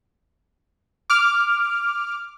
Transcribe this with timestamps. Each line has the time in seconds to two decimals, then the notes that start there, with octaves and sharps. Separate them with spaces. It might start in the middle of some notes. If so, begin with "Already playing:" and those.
1.10 D6 F6